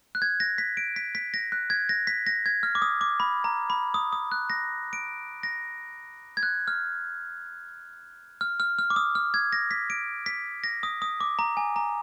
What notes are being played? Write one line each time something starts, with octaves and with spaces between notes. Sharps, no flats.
F#6
G#6
A#6
B6
D7
B6
B6
A#6
F#6
G#6
A#6
B6
A#6
G#6
F6
D6
D#6
D6
B5
A#5
B5
D#6
D#6
F#6
A#6
D7
A#6
G#6
F#6
F6
F6
F6
F6
D6
D#6
F6
G#6
A#6
B6
D7
B6
A#6
D#6
D#6
D6
A#5
G#5
A#5